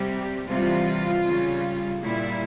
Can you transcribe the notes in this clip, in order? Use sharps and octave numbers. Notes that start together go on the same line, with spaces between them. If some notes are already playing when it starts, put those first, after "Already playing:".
Already playing: C3 G3 G4
C3 E3 G3 F4
C#3 G3
A#2 G3 E4